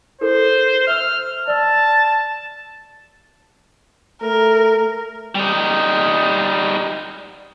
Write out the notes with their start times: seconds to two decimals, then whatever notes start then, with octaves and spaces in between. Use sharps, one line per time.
0.21 E4 A4 A#4 C5
0.87 E5 E6 F6
1.48 D5 A5 E6
4.22 A3 A#4
5.35 G3 D#4